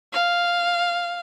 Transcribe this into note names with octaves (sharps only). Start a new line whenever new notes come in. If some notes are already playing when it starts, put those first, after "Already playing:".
F5